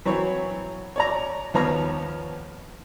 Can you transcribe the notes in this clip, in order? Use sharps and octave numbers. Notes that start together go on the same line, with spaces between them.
E3 F#3 C4 C#5
C#5 D5 A#5
D#2 F3 B3 C#5 A#5 F6